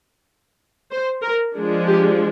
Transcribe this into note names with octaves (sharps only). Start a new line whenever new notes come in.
C5
A#4
F3 G#3 D4
G4